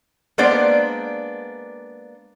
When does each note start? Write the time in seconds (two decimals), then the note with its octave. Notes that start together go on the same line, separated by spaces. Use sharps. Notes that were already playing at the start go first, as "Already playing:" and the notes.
0.38 G#3 A#3 B3 D4 C5 D5